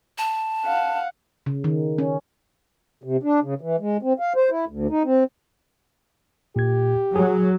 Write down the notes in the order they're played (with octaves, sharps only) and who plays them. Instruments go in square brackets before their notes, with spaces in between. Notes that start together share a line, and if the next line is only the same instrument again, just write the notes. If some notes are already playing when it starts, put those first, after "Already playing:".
[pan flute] A5
[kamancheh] F5 F#5
[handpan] C#3
D#3
C#4
[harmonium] C3
D4
C#3
E3
G#3
C4
F5
C5
E4
D2
D#4
C4
[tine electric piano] A#2 G#6 [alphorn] G4
[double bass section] F#3 [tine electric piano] G#4